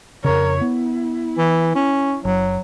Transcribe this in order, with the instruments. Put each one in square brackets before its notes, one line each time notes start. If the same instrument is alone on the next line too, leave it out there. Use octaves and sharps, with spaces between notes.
[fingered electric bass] F2 C#3 [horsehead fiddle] A#4 C#5
[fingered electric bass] B3 [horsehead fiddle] E4
[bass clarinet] E3
C#4
[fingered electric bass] F#1 [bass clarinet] F#3